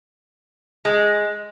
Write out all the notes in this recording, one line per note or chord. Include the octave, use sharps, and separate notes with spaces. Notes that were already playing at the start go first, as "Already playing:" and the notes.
G#3